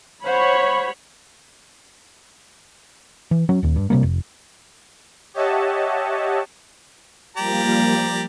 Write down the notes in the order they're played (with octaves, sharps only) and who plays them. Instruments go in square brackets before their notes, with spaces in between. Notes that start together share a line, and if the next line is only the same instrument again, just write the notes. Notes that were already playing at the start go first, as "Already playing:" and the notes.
[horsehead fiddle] C5 F#5 [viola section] C#5 B5
[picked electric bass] E3
F#3 C#4
D#1 D#2
G2
C3 E3 G3 A#3
F1
[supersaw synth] G4 C#5 D#5 E5 F#5 A5
[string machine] F3 G3 A#3 [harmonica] G4 D5 A#5